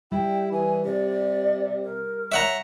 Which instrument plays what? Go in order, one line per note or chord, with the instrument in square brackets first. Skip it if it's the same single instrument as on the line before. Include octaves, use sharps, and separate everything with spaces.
[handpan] G3 [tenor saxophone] E4 [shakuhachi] G5
[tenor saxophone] E3 [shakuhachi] G#5
[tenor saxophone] C3 [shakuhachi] D5
[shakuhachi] A#4
[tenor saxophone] C#5 [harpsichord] E5 F#5 A#5